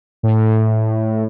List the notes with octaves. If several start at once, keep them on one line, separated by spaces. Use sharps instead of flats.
A2